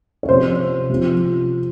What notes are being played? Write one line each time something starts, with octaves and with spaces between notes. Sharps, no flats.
C#5
C3 F3 C5
C3 F3